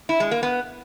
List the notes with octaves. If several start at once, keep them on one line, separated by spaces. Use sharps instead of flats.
E4
G#3
A#3
B3